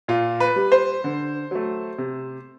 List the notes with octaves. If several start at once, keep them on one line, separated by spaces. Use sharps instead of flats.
A#2 F4
B4
G3
C5
D3
F#3 A3
C3